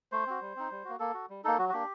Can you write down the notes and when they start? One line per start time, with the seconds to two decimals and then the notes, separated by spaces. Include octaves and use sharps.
0.12 A3 C5
0.27 C4 F#4
0.41 G3
0.56 C4 D#4
0.71 G3
0.85 A#3 F#4
0.99 A#3 A4
1.14 F#4
1.30 G3
1.44 A#3 D#4 A4
1.59 F#3 F#4
1.69 F#4
1.73 A#3 D4 G4